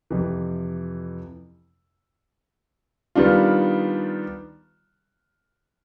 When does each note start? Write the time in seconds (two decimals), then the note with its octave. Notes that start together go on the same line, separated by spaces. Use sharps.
0.10 F2 C3 E3
3.15 D#3 G3 B3 D4 F4